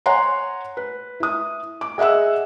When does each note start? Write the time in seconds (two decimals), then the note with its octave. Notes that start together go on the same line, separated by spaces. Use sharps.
0.06 C#5 F#5 G#5 A#5 C6
0.77 B4
1.20 E4 D#6
1.81 D6
1.98 G#4 D#5 E5 F#5 E6